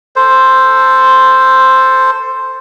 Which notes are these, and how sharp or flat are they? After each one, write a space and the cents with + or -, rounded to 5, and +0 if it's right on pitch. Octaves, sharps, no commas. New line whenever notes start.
A4 +15 C5 +0